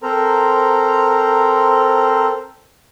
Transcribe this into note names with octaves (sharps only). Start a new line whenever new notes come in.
C4 A4 A#4 C5 A#5